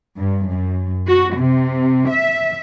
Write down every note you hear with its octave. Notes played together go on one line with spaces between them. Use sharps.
G2
F#2
F#4
C3
E5